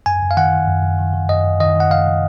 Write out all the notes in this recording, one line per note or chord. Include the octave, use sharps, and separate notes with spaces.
F#2 G#5
F#2
F5
D#3 F#5
D#3
F#2
F#2
D#3
D#3
F#2 D#5
F#2
D#3 D#5
D#3 F#5
F#2 F5